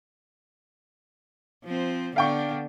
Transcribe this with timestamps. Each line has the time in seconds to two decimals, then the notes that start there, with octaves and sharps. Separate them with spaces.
1.64 F3 C4
2.16 D3 B3 D4 F5 G5 C#6